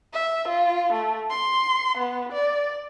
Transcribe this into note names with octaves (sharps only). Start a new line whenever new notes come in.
E5
F4
A3
C6
B3
D5